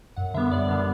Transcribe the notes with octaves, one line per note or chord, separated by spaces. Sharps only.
F#2 F#5
D3 G3 B3 E5
F#2 D5
D3 G3 B3